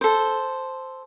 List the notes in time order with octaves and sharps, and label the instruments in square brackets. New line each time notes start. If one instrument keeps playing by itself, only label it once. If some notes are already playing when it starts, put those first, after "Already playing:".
[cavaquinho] A4 C5